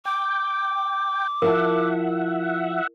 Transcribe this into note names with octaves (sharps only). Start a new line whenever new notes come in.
G5 D6
F3 E4 A#4 E5 F#5 A5